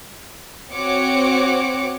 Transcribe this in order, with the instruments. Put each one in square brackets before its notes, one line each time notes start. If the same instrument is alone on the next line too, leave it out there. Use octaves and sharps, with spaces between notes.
[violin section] C4 F#4 C#5 D6 C#7